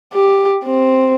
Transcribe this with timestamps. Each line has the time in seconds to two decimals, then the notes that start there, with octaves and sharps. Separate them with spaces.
0.14 G4
0.65 C4